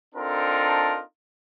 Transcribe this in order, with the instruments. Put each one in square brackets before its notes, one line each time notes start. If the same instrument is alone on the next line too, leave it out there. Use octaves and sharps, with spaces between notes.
[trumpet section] C4 D4 D#4 F4 A4 A#4